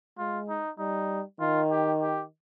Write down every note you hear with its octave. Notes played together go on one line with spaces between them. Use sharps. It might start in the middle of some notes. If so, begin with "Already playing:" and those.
G#3 F4
D#4
G3 D#4
D#3 F4
G4
G4